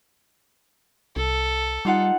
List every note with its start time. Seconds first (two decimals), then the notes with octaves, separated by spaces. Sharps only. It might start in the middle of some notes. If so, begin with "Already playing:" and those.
1.16 C2 A4
1.85 G3 D#4 F4 F#5